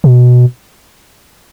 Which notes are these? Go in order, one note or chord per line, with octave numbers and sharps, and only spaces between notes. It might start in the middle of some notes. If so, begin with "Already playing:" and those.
B2